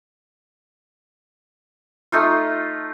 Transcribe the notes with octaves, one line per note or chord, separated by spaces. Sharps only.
A3 D#4 F4